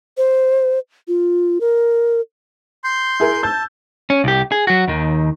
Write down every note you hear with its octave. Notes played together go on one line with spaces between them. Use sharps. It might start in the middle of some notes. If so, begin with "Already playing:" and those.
C5
F4
A#4
C6 G6
E4 G#4 A#4
A5 E6 G6
C#4
C2 G4
G#4
F#3 F#4
D#2 D#3